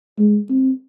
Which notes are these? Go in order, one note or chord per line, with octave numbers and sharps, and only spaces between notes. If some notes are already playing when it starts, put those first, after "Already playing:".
G#3
C4